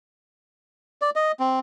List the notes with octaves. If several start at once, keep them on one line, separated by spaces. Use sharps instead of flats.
D5
D#5
C4